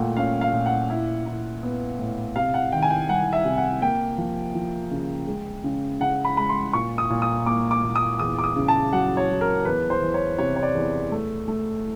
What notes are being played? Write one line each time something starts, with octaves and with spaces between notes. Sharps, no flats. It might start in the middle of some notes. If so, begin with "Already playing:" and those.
Already playing: A#2 A3 F#5 G5
C#4 F5
F5
A#2
F#5
E4
E4
B3
A2
C3 F5
F#5
D#3 G5
G#5
G5
C2 F#5
E5
C3
F#5
A#3 G5
F3
F3
C#3
G#3
C#3
C#3 F#5
B5
G#3 B5
C6
A#2 C#6
D#6
A#2
D#6
A#3 D6
D6
A#2
D#6
E2 D#6
D6
D#6
C#3
A5
F#3 F#5
C#5
F#3
A#4
E2 B4
C5
E3
C#5
C3 C#5
C#5
D5
E2
A3
A3